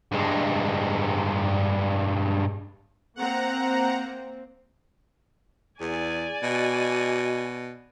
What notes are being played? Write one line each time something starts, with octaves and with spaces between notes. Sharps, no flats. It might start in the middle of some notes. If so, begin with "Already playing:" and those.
G2 G#3
A#3 C4 F#5 A#5
E2 D5 G#5
B2 F#4 D#5